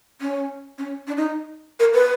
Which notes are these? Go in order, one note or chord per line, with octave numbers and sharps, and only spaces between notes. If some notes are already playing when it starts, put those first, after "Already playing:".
C#4
C#4
D4
D#4
A#4
B4